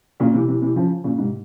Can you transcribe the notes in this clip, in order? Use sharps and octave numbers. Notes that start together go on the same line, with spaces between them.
A#2 C#3
C3 E3
C3 E3
C3 E3
C#3 F3
A#2 C#3
G#2 C3